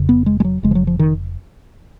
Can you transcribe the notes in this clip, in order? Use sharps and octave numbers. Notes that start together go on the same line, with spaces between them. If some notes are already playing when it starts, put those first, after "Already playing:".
Already playing: F1 F2 C#3
B3
G#3
G#3
F#3
F1 F2 C#3 G#3
F3
F#3
F3
D#3